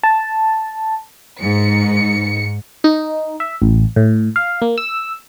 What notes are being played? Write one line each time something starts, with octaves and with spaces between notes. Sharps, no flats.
A5
G#2 C#7
D#4
E5
A1
A2
F5
A#3
E6